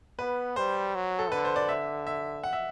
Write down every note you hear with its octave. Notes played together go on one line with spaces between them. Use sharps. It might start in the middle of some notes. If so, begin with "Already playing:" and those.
B3 B4
G3 C5
F#3
A4
D3 B4
C5
D5
E5
E5
F#5
E5